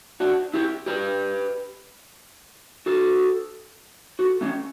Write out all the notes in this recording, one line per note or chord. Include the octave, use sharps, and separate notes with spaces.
D4 F#4
E4 G4
G4 B4
F#4 A4
F#4 A4
A3 C#4